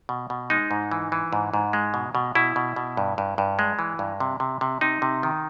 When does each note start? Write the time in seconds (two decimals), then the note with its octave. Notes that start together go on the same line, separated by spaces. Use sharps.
0.09 B2
0.30 B2
0.50 G#3 D#4
0.71 G#2
0.91 E3
1.12 E3
1.33 G#2
1.54 G#2
1.73 G#3
1.94 B2
2.15 B2
2.35 B2 E4
2.56 B2
2.76 B2
2.97 G2
3.18 G2
3.38 G2
3.59 G#3
3.79 E3
3.99 G2
4.20 C3
4.40 C3
4.61 C3
4.81 C3 D#4
5.02 C3
5.23 D#3